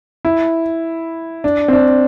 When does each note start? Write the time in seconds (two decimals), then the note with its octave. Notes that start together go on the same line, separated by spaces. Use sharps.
0.25 E4
1.44 D4
1.68 C4
1.73 D4